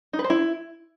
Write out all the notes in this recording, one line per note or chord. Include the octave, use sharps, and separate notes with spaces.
D#4
B4
C5
E4